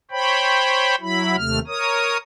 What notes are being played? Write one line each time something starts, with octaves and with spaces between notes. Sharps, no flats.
C5 C#5 G5 B5
F#3 E4 B5
D#2 C3 A3 F6
A#4 C#5 D#6